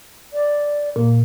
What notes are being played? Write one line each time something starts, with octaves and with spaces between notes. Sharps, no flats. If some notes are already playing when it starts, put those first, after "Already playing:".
D5
A#2 A#3